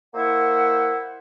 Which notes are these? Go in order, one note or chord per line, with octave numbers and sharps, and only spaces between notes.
A#3 E4 C5 E5 F#5